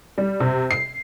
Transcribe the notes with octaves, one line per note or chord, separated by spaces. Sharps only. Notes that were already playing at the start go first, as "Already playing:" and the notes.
G3
C3
C7